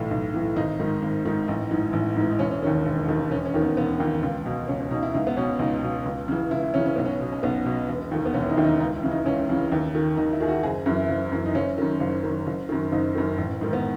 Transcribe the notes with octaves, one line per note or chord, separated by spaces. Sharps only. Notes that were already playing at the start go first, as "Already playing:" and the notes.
Already playing: B1 A2 E3
B1
A2 E3
G#1 D#4
G#2 D#3
G#1
G#2 D#3
A1 D#4
G#2 E3
A1
G#2 E3
D#4
E1 C#4
C#4
D#2 D#3 C#4
C#4
E1
D#2 D#3
E1 C#4
C#4
D#2 D#3
B3
E1 B3
D#2 D#3
C#2
B2
C#2 C#4
C#4
B2 D#4
E4
C#2 D#4
B3
B2 C#4
C#2 D#4
B2
C#2
C#3 E3
C#2 E4
E4
C#3 E3 C#4
C#4
B1 B3
C#4
B2
C#4
B1 B3
B2
E1
D#2 D#3
B3
E1 C#4
E4
D#4
D#2 D#3
D#4
C#2 D#4
E4
C#3 E3
D#4
C#2 C#4
C#3 E3
D#2
D#3
D#2 D#4
E4
D#3 G#4
F#4
F#1 G#4
F#2 E3 E4
F#1
F#2 E3
D#4
F#1 C#4
F#2 D#3
F#1
F#2 D#3
F#1
F#2 D#3
F#1 D#4
F#2 D#3
A1
G#2 D#3
B3